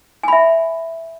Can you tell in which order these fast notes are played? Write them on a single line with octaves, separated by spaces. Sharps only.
G#5 B5 E5